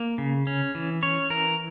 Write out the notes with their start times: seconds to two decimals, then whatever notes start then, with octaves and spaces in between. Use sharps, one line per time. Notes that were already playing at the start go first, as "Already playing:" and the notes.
Already playing: A#3
0.18 C#3
0.47 C#4
0.75 E3
1.03 C#4 C#5
1.30 E3 A#4